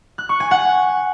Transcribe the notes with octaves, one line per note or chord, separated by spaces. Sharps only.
F#6
C#6
G#5
F#5